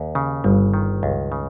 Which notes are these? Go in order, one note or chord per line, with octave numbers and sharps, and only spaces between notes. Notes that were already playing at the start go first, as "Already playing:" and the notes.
Already playing: D#2
C#3
G1 G2 G3
D#3
C#2
C#3